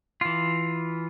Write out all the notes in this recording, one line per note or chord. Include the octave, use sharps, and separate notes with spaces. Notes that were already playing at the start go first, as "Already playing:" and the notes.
E3 F4